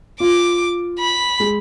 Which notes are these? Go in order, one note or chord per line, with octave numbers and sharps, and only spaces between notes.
F4 D6
B5
G#3 G#4